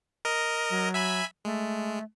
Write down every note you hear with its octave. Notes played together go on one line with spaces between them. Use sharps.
A#4 D#5
F#3
E5 G#5 B5
G#3 A3